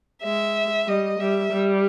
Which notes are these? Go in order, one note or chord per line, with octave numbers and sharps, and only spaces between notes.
G#3 E5
G3 D#5
G3 E5
G3